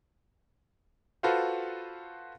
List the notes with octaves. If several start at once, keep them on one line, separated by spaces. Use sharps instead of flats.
F4 F#4 A4 B4 C5 F5